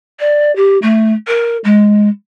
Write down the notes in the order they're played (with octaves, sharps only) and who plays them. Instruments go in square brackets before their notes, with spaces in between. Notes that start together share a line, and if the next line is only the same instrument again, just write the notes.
[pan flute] D5
G4
A3
A#4
G#3